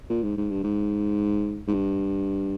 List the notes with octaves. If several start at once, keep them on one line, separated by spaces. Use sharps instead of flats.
A#2
G#2
G#2
G2
G#2
G#2
G2